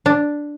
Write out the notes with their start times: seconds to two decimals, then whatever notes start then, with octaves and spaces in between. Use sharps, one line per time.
0.06 D4